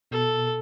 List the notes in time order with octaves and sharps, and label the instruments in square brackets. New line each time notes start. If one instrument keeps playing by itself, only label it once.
[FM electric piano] B2 [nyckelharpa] A4